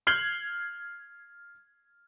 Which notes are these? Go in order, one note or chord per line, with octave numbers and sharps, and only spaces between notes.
F6 G6 G#6 C7 F#7 G7